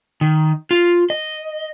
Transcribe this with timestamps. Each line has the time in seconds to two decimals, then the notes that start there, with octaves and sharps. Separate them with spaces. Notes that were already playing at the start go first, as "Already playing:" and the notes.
0.21 D#3
0.71 F4
1.10 D#5